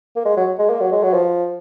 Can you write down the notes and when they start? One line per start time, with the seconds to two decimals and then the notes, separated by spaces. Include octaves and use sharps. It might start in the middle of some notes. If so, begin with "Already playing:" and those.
0.16 A#3
0.25 G#3
0.37 F#3
0.59 G#3
0.70 A#3
0.81 F#3
0.92 G#3
1.03 F#3
1.13 F3